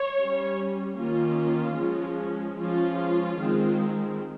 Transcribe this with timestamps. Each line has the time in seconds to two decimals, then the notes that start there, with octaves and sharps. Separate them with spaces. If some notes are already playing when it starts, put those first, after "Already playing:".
Already playing: C#5
0.18 G3 C#4
0.97 D#3 A#3 C#4 F4
1.78 F3 G#3 C#4
2.58 F3 G#3 C#4 F4
3.39 D#3 G#3 C4